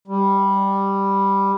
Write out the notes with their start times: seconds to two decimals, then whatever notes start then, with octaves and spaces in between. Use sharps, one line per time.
0.08 G3